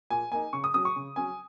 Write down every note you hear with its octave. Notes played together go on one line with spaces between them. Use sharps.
A#2 G#5
A#3 D#4 G#5
C#3 C#6
D#6
F#3 C#4 D#6
C#6
C#3
F#3 C#4 G#5